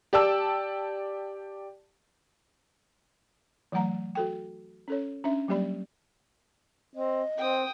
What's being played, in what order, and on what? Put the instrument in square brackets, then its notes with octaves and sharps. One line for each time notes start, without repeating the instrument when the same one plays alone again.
[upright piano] G4 D5 G5 A5 E6
[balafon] E3 F#3 A3 F#5 A#5
F#4 A4 G5
C#4 A4 C#5
C#4 D4 E5
F#3 G3 A#3 G4 D5 B5
[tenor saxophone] C4 [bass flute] D#5
[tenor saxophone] C4 [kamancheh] G5 D#6